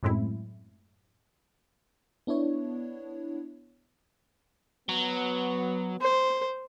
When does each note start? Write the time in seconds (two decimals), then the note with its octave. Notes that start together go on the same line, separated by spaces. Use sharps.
0.03 F#2 A2 G#3 C4 E4
2.27 B3 D4 E4 C#5
4.89 F#3 B3
6.01 C5